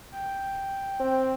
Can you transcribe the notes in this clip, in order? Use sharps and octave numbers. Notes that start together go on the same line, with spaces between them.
G5
C4